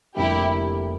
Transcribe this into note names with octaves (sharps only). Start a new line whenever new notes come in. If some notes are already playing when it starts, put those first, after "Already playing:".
F1 F2 D3 G3 A#3 E4 G4